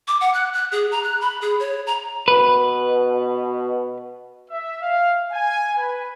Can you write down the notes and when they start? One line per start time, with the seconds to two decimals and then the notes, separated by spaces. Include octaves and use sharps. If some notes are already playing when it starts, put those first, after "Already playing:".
0.08 D6
0.21 F#5
0.34 F#6
0.53 F#6
0.72 G#4
0.91 A#5
1.04 F#6
1.21 B5
1.41 G#4
1.59 C#5
1.86 A#5
2.28 B2 B4
4.50 E5
4.82 F5
5.31 G#5
5.77 B4